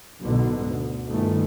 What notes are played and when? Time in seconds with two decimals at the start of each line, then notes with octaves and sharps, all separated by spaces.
0.21 B1 G#2 B2 D3
0.65 D2
1.08 G1 D#3 A3